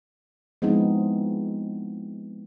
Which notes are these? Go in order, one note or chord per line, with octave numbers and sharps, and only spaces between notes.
F3 G#3 B3 C4 D#4 E4